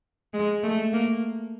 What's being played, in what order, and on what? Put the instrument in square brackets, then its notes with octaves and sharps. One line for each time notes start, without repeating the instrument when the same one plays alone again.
[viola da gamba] G#3
A3
A#3